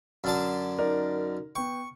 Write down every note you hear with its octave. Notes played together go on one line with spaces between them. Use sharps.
F#2 D3 A5
D#4 A#4 D5
B3 G5 C#6